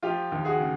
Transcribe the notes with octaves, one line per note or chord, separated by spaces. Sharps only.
F3 F4 G4
D#2
F#4 G#4
C#3